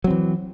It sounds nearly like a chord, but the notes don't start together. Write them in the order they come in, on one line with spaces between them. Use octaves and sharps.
F#3 C4 E3